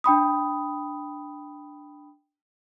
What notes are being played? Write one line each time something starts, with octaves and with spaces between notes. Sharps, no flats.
D4 G5 B5 D#6